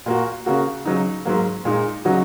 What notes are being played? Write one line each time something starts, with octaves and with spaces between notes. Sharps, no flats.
A#2 A#3 F#4
C#3 A#3 F#4
C#3 F#3 D#4
G#2 F#3 A#3
A#2 G#3 D#4
C#3 F#3 D#4 F#4